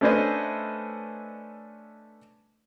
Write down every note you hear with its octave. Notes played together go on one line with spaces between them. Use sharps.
A3 C#4 D4 B4 C5 D#5